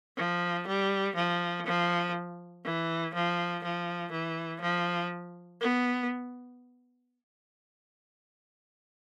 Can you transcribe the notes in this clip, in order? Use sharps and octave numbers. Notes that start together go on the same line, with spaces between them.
F3
G3
F3
F3
E3
F3
F3
E3
F3
B3